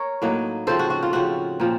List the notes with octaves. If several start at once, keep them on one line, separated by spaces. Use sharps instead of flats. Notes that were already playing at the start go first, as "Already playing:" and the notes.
Already playing: A#4 C#5
A2 F#3 A#3 D#4
C#3 F3 C4 A4 C5
F#4
F#4
F4
C#3 F3 C4 F#4
A#2 F3 C4